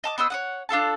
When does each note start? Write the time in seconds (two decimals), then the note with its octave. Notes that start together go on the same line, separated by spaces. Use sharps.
0.04 D#5 A5 D6
0.18 B3 C5 D#5 E6
0.30 C#5 D#5 F#5
0.69 D4 F4 A4 A5